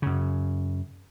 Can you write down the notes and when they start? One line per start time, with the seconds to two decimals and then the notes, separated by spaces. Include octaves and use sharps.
0.02 F#2 C#3